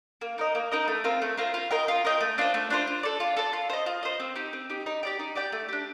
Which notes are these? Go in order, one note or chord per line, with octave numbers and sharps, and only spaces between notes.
A#3
D#4 A#4 D#5
A#3
D#4 A#4 D#5
A3
C4 F4 A#4
A3
C4 F4 A#4
F4
A#4 D#5 G5
F4
A#4 D#5 G5
A3
D4 F4 C5
A3
D4 F4 C5
F4
A4 D5
F4
A4 D5
F4
C5 D#5
F4
C5 D#5
C4
D#4 G4
C4
D#4 G4
D#4
G4 D5 G5
D#4
G4 D5 G5
A3
D4 G4